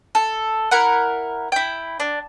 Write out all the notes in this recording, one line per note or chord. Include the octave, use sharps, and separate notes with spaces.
A4
E4 A#4 F#5
E4 G5
D4